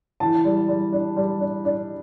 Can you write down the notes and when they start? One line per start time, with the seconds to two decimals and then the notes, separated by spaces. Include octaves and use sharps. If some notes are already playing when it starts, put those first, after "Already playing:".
0.20 E3 A5
0.45 G3
0.68 G3
0.93 D4
1.16 G3
1.40 D4
1.65 D4